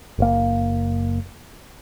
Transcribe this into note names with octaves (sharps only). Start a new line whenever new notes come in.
F#1 A#3